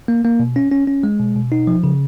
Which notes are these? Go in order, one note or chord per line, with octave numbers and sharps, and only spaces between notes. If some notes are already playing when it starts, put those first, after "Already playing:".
A#3
A#3
B2
C#4
C#4
C#4
G#3
B2
B2
D#4
F3
C#3